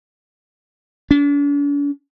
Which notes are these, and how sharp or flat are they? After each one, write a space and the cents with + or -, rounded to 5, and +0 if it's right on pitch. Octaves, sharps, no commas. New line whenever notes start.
D4 -45